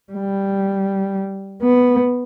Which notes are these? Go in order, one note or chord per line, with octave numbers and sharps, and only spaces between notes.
G3
B3